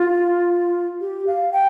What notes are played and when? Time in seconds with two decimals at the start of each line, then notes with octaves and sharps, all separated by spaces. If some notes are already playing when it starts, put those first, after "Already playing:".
Already playing: F4
1.01 G4
1.27 F5
1.52 G5